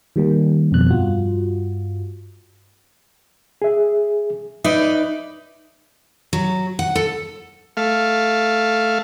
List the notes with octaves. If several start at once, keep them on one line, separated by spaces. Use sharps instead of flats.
D#3 G3 A#3
F2 B2 F#6
G2 F4 F#4
G#4 E5
D#4 B4 D5 E5
F#3
F#5
A4
A3 F5